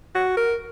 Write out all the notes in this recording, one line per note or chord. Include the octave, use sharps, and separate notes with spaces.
F#4
A#4